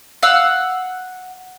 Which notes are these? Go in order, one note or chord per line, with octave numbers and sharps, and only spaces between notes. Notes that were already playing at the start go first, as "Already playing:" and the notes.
F5 F#5 E6